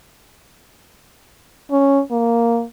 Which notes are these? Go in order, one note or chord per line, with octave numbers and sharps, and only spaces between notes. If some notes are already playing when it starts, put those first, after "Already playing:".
C#4
A#3